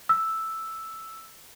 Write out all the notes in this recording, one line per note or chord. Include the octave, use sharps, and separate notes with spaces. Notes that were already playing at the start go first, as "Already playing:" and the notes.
E6